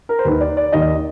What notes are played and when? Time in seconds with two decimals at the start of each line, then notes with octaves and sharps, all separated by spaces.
0.09 A#4
0.19 C5
0.25 D#2 D#3 B4
0.40 D5
0.57 D5
0.72 D#2 D#3 D#5